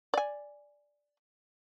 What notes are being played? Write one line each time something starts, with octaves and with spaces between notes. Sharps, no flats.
D5 G#5